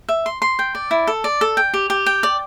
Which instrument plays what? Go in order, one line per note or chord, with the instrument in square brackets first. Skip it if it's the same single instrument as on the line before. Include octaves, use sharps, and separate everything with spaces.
[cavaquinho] E5
C6
C6
G5
D5
E4
A4
D5
A4
G5
G4
G4
G5
D5